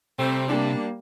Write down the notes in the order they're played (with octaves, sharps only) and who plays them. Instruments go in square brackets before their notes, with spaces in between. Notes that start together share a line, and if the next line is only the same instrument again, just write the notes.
[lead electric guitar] C3 [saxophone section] G3 A3 C4
[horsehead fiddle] G3 A#3 [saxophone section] D4